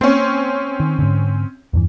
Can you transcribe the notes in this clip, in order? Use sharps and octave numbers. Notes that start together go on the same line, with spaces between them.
A#3 C4 C#4
D#3
G#2 D3
E2 G2 E3